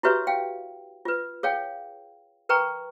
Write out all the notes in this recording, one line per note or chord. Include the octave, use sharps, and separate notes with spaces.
E4 F#4 G4 B4 C#5 E5
F5 G5
F4 B4
G#4 C#5 F5 G5
A#4 B4 G5 A#5 C#6